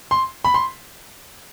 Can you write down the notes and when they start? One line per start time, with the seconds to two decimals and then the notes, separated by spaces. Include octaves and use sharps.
0.11 C6
0.45 B5
0.54 C6